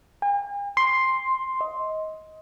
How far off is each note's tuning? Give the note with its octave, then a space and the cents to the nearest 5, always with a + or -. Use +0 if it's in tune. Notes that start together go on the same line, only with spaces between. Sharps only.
G#5 -45
C6 +5
D#5 +20